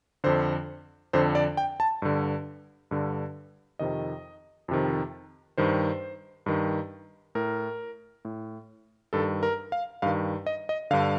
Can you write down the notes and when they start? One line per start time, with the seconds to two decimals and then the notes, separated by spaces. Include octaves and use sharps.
0.24 F2 D3 C5
1.13 F2 D3 C5
1.35 D5
1.57 G5
1.80 A5
2.02 G2 D3
2.91 G2 D3
3.79 F2 C3 D#3 D#5
4.68 F2 C3 D#3
5.58 G2 D#3 C5
6.46 G2 D#3
7.35 A2 A#4
8.25 A2
9.13 G2 D#3 A4
9.43 A#4
9.72 F5
10.02 G2 D#3 F5
10.46 D#5
10.69 D#5
10.91 G2 D3 F5